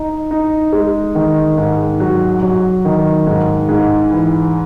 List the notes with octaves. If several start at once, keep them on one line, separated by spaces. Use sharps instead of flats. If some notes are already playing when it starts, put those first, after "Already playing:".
Already playing: D#4
D#4
G#3
D#3
G#2
F#3
F#3
D#3
G#2
G#2
E3